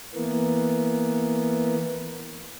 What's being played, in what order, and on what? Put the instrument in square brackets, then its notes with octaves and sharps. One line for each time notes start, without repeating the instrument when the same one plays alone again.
[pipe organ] E3 A#3 B3